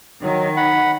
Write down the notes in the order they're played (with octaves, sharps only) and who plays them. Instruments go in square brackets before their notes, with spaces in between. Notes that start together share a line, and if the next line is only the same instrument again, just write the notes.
[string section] D#3 [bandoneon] F#3
[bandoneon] F#5 B5